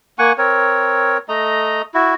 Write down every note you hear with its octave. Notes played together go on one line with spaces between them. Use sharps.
A#3 F#5 G#5 C#6
C4 A#4 C#5
A3 D#5 A#5
E4 F#4